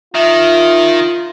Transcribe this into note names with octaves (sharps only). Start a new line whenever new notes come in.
D#3 F4 E5